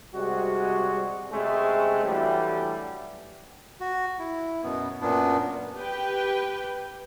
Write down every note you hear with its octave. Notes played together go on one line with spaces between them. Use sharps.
C3 G3 G#3 F#4
C3 G#3 A3 C4 C#4
E3 F#3 G3 A3 D4
F#4
E4
F#2 B2 B3
F#2 A#2 B3 D4
G4 B4 G5